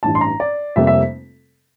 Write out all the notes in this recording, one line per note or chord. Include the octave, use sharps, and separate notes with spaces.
A1 G2 E3 A5
C6
A#5
D5
F1 F2 C3 G3 A#3 E5
E5